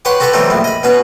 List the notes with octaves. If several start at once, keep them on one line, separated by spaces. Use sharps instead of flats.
G4 B4 C#5 F#5 C6
F#4 G4 A4 B4 B5 C#6
E3 F#3 G3 A3 C4 D#4
A#1 F2 A2 E4
D#5 B5
B2 C#4 F#4 B4